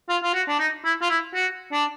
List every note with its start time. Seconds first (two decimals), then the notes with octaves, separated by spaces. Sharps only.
0.09 F4
0.23 F4
0.34 F#4
0.48 D4
0.60 D#4
0.85 E4
1.02 F4
1.10 E4
1.35 F#4
1.72 D4